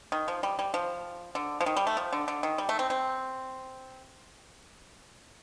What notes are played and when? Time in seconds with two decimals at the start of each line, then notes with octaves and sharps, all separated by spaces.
0.12 D#3
0.28 F3
0.43 G3
0.59 G3
0.74 F3
1.35 D3
1.61 F3
1.66 D#3
1.77 G3
1.87 A3
1.97 F3
2.13 D3
2.28 D3
2.43 D#3
2.58 G3
2.69 A3
2.79 C4
2.90 C4